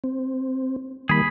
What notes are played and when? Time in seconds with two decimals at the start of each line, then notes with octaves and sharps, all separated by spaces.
0.04 C4
1.09 D#3 G3 A#3 G#4 B5